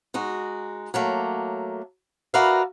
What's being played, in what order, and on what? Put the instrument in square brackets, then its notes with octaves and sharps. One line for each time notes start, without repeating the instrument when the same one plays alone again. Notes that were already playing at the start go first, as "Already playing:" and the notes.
[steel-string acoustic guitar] G#3 D#4 F#4
F#3 A3 A#3
F#4 A#4 B4 D5 E5 F5